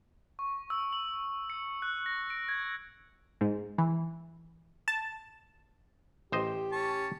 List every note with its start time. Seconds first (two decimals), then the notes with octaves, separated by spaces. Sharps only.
0.39 C#6
0.70 E6
0.93 F#7
1.50 C#7
1.82 F#6
2.06 A#6
2.30 D7
2.49 G#6
3.41 G#2
3.78 E3
4.88 A5
6.32 A1 G4 C5 D#5
6.72 C#4 A5 C#6